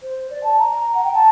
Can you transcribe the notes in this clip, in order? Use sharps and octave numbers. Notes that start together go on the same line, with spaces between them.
C5
D5
A5
A#5
F#5
G5
A5